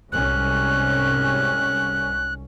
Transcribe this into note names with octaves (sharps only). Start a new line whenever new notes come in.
C2 G#2 C#4 F#6